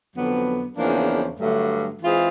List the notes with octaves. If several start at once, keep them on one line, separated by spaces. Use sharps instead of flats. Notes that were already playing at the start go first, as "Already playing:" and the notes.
F2 D3 F#3 B3
E2 C#3 F3 A#3 D4
G2 D3 F#3 A3
E3 G#3 C4 F4 G#4